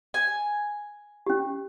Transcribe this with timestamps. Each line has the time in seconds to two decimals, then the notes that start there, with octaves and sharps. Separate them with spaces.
0.14 G#5
1.26 C#4 G4